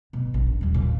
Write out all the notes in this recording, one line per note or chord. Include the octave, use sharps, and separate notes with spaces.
B2
A#1
D#2 F#3
A#2